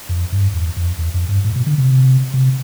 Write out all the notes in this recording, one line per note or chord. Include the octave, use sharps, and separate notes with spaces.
F2
G2
E2
F2
E2
F2
G2
A2
B2
D3
C3
C3